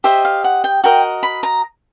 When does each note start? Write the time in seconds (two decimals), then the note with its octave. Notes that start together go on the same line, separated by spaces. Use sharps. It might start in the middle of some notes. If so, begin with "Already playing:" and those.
0.04 G4 C5 D#5 E5
0.25 F5
0.44 F#5
0.64 G5
0.84 F#4 A#4 D#5 G5
1.23 B5
1.43 A#5